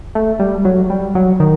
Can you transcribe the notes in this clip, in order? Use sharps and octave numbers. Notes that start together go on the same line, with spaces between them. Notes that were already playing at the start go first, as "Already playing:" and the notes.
A3
G3
F#3
G3
F#3
D#3